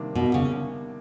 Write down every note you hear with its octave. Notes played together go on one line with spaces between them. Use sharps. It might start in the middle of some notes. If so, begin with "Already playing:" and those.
Already playing: C3 D#3 G3 A#3 D4
B2
C#3